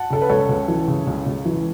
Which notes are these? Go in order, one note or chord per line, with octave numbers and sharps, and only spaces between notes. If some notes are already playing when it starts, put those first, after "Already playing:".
Already playing: F#5 A5
C#3 A4
B4
C#2 A4 C#5
C#2
E3
C#3
C#2
C#2
E3